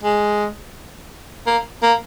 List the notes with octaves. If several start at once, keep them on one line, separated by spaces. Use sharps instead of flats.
G#3
A#3
A#3